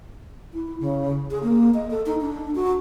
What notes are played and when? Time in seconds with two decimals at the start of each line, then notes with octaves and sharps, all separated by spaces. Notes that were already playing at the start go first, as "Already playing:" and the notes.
0.53 E4
0.80 C#3
1.31 G#4
1.43 A#3
1.74 D#5
1.90 A4
2.06 D#4
2.21 D4
2.55 F#4